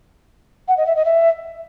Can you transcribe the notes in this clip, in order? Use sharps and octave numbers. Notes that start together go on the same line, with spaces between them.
F#5
D#5
E5
D#5
E5